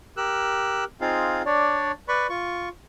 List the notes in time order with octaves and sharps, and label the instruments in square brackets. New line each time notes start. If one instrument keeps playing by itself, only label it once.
[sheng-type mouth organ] G4 A#4 E6 F#6
C4 D#4 F4 G#4 F5
D4 C#5 D5
B4 D5 B5 C#6
F4 C#6